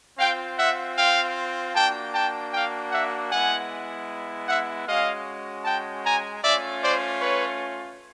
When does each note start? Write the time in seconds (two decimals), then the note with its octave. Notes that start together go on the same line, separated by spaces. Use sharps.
0.18 C4 F4 F5 G5
0.57 E5 F#5
0.96 F5 G5
1.75 A#3 D4 F#4 G5 A5
2.14 G5 A5
2.53 F5 G5
2.92 E5 F#5
3.31 G#3 B3 E4 F#5 G#5
4.47 E5 F#5
4.86 G#3 C#4 F#4 D#5 F5
5.64 G5 A5
6.03 G#5 A#5
6.43 A3 C#4 F4 D5 E5
6.82 C5 D5
7.20 B4 C#5